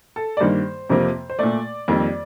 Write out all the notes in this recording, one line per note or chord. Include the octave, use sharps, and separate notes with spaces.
A4
D5
G2 D#3 G3 A#3 C5
F2 C3 F3 A#3
C5
A#2 A3 D5
F2 D#3 G3 A#3